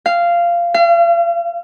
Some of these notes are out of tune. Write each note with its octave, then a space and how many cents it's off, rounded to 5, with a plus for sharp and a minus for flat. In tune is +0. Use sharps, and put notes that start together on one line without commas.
F5 -15
F5 -40